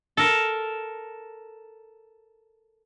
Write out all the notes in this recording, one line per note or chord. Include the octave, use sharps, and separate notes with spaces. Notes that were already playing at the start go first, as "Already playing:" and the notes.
A4 A#4